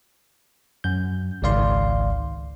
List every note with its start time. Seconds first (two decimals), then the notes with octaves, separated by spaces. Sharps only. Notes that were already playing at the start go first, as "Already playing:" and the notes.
0.84 F#2 G6
1.42 G#1 C#2 D#3 D5 F5 C6